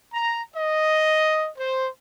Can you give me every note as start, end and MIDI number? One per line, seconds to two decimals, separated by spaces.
0.14 0.40 82
0.54 1.48 75
1.58 1.88 72